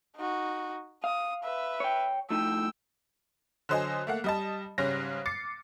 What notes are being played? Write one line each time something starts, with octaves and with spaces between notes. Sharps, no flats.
D#4 F#4
F5 D#6
B4 E5
C#5 G5
A2 F3 D#4 G5 E6
D3 F#3 C5 D#5 G#5
A3 A#3 F#5
G3 D#5 A5
G#2 C#3 G3 C#4 A#6
D6 A6 C7 C#7